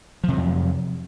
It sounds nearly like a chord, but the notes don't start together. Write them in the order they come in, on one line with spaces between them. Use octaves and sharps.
F3 C3 F#3 F2